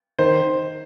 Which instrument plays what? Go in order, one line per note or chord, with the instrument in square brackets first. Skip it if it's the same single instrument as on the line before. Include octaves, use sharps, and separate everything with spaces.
[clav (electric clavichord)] D#3 [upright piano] C5